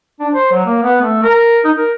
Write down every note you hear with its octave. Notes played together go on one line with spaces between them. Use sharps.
D4
C5
F#3
A#3
B3
A3
A#4
D#4
A#4